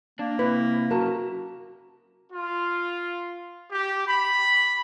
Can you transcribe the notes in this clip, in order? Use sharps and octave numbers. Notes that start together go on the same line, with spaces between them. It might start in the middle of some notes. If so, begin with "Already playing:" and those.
A#3 D4
C3 E4 B4
F#2 C#3 F#4 A#4 A5
F4
G4
B5